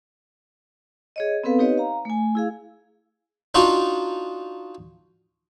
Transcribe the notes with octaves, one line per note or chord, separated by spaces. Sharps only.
G#4 C#5 D#5
B3 C4 A4 B4 F5
D#4 G4 B4 C#5 D#5
F5 A#5
A3 G#5
E4 G#4 F5
D4 D#4 F4 F#4